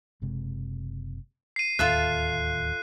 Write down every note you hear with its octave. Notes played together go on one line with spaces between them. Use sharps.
F#1 C3 G#3
C7 D#7
D1 D#2 F4 A4 E5 F#6